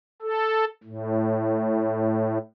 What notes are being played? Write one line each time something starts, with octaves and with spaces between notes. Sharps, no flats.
A4
A2